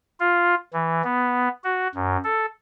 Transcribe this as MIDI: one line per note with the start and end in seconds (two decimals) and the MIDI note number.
0.20 0.55 65
0.73 1.02 52
1.04 1.48 59
1.64 1.88 66
1.95 2.17 42
2.24 2.46 69